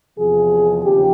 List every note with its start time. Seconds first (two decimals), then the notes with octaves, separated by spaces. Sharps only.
0.18 E2 C3 F3 G#4
0.83 D#2 C#3 F3 G4